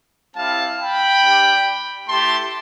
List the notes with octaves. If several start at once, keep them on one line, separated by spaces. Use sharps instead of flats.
G3 C4 E4 F5 A5
G5 B5
G3 D4 G4
A3 E4 G4 A5 C6